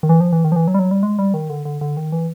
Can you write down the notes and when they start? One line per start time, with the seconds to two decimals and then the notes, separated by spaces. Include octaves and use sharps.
0.03 D#3
0.09 E3
0.20 F3
0.33 E3
0.44 D#3
0.52 F3
0.56 E3
0.68 F#3
0.74 G3
0.79 F#3
0.91 G3
1.03 G#3
1.19 G3
1.34 D#3
1.50 D3
1.65 D3
1.81 D3
1.97 D#3
2.12 E3